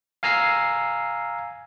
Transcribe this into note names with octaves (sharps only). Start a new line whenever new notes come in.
F5 G#5 A#5 E6 C7